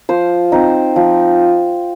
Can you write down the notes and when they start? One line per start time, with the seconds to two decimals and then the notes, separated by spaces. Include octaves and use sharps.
0.09 F3 C5
0.52 C4 D#4
0.96 F3